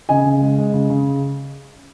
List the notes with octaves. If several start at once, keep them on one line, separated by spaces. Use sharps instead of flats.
C#3 D#5 G#5
C#3
G#3
G#3
C#3
C#3